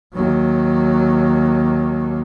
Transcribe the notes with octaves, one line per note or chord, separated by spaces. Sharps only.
D#2 F#3